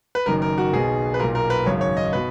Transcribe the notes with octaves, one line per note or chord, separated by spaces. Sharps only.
B4
F#1 F#2 D#3 A#4
A#4
F#4
B1 B2 G#4
B4
B1 A#2 A#4
A#4
B4
G#1 F#2 C#3 C#5
C#5
D#5
B2 B4